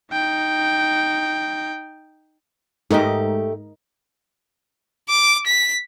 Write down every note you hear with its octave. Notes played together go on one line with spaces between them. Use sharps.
D#4 G5
G#2 A3 D#4 G4 A#4 D#5
D6
B6